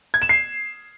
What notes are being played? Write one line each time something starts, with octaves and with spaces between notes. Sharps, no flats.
G#6
E7
C7